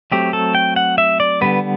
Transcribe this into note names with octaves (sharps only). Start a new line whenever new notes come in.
F#3 A3 C4 G4
A4
G5
F#5
E5
D5
D3 G3 B3 B4